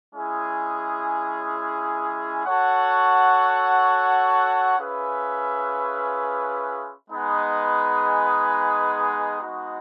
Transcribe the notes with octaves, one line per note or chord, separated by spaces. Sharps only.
G#3 C#4 E4 G#4
F#4 A4 C#5 F#5
C#4 F4 G#4 B4 E5
G#3 B3 D#4 G#4 B4
G#3 B3 D#4 F#4